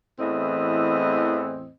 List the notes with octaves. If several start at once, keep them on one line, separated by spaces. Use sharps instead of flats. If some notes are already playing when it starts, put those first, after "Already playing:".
E2 A2 E3 C4 D#5